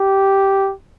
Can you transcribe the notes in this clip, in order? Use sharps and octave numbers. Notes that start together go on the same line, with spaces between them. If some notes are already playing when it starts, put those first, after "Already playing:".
Already playing: G4